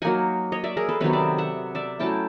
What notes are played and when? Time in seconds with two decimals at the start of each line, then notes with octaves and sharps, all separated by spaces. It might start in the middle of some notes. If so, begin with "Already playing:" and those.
0.02 F#3 A#3 D#4 F#5 G#5
0.52 C#5 D#5
0.64 D5 E5
0.77 G#4 A#4
0.89 A4 B4
1.01 C3 D#3 F#3 B3 B4 C#5
1.13 D5 E5
1.38 E5 F#5
1.75 D5 E5
1.99 F#3 A3 C#4 E4 G5 A5